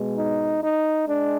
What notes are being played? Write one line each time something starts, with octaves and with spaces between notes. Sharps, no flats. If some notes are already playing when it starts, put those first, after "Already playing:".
Already playing: B2 G#3
D#4
D#4
G#3 D4